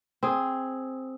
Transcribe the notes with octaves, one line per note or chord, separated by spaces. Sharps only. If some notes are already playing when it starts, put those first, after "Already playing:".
C4 G#4